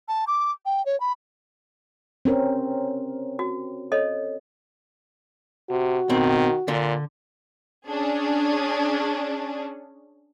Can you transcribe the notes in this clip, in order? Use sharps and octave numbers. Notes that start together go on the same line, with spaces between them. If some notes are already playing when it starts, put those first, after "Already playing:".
A5
D6
G5
C#5
B5
C4 C#4 A#4
F#4
A4 C#5 D#5
C3 F#4
B2 D#3 C4
A#2 D3
C#4 D4 G#4